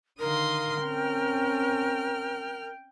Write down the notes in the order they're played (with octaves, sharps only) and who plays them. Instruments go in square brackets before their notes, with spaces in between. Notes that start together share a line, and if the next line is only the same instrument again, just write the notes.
[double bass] D3 D#3 [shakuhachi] A#4 [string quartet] F5 C6 D#6
[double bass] C4 C#4 [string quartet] G5 F6